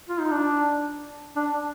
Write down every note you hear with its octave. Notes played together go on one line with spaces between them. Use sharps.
F4
D#4
D4
D4